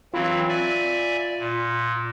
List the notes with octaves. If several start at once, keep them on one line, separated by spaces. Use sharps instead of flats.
E3 F#3 C4 F4 B5
D5 E5 G#5
A#2